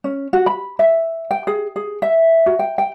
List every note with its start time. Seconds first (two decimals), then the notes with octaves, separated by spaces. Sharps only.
0.04 C#4
0.33 F#4
0.46 B5
0.79 E5
1.31 G5
1.47 G#4
1.76 G#4
2.02 E5
2.46 F#4
2.59 G5
2.78 G5